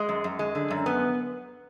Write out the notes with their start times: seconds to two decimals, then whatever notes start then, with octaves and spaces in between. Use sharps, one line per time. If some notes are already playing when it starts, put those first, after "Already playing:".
Already playing: G#3
0.09 F#2
0.24 F#2
0.39 G#3
0.55 D3
0.71 F#2
0.86 B3